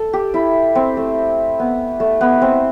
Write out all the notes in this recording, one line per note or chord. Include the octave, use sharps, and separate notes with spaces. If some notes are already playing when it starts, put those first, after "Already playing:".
Already playing: A4
G4
E4
C4
A3
B3
A3
B3
C4